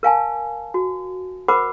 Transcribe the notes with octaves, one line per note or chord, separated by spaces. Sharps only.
A#4 F5 G#5 A5
F#4
A#4 C5 F#5 B5 D6